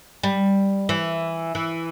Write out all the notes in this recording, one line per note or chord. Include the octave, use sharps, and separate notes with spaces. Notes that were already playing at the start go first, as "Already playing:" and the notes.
G3
E3
E3